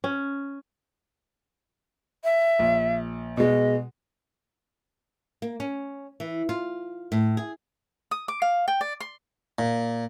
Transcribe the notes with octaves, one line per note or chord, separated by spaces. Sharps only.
C#4
E5
A#1
B2 G#3 D#5
A#3
C#4
E3
F4
A2
G#4
D#6
D6
F5
G5
D5
C6
A#2